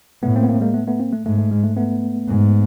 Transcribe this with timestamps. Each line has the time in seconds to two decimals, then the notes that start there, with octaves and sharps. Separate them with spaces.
0.23 A2 A3 B3
0.36 A#3 C4
0.43 B3
0.49 A#3 C4
0.61 G#3 A#3
0.74 A3 B3
0.87 A3 B3
1.00 A#3 C4
1.13 A3
1.25 G#2 A3
1.38 A3
1.51 G#3
1.64 A3
1.76 A3 B3
2.28 G#2